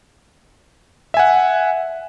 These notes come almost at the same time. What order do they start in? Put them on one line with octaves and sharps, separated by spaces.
E5 G#5 F#5